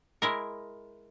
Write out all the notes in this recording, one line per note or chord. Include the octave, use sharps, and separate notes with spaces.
G#3 E4 A#4